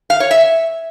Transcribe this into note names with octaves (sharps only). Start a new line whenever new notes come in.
F5
C#5
E5